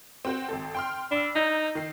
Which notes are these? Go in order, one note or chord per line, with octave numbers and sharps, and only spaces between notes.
C4 F#4 C5
G#1 C4 A4
G5 C6 F6
D4 B5 E6
D#4 A#5 G6
D#3 C7